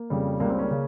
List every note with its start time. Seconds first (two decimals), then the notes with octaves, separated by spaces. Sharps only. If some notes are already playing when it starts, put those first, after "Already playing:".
Already playing: A#3
0.10 F2 C#3 G3
0.40 C#2 C#3 G3 A#3
0.50 C4
0.59 A#3 C#4
0.71 C#3